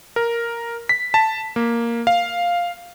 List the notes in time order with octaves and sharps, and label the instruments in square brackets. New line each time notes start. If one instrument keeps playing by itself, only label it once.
[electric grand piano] A#4
B6
A5
A#3
F5